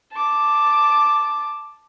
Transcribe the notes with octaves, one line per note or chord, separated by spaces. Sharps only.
A5 D6